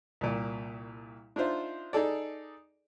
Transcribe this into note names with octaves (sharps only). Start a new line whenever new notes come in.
C2 A#2
D4 D#4 F4 C5 E5
D#4 G#4 A4 D5